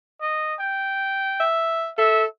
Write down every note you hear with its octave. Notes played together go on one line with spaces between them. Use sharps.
D#5
G5
E5
A4 E5